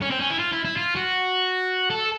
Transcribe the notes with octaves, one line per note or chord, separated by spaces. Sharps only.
C#4
C4
C#4
E4
F4
E4
E4
F4
F#4
A4